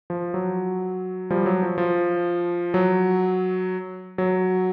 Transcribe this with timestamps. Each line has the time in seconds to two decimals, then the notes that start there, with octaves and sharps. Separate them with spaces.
0.10 F3
0.34 F#3
1.30 F3 G3
1.46 F#3
1.63 F3
1.78 F3
2.74 F#3
4.18 F#3